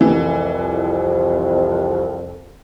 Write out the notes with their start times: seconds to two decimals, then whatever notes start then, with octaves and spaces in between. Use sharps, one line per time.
0.01 C2 F2 E3